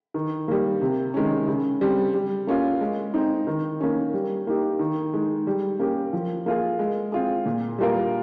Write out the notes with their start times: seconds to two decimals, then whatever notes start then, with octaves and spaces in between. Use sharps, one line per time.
0.14 D#3
0.48 G3 A#3
0.82 C3
1.14 D#3 G#3 C#4
1.47 C#3
1.81 G3 C4
2.14 G3
2.47 A#3 C#4 F4
2.81 G#3
3.14 C4 D#4
3.47 D#3
3.81 A#3 C#4
4.14 G3
4.47 A#3 D#4 G4
4.79 D#3
5.14 G#3 D#4
5.47 G3
5.79 A#3 C#4 G4
6.13 F3
6.46 A#3 F4 G#4
6.79 G#3
7.12 C4 F4 G#4
7.46 A#2
7.78 G3 A#3 F4 A#4